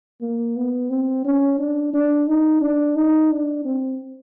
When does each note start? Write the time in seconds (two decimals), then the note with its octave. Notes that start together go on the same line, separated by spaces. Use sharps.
0.21 A#3
0.57 B3
0.90 C4
1.25 C#4
1.59 D4
1.94 D4
2.28 D#4
2.61 D4
2.96 D#4
3.31 D4
3.65 C4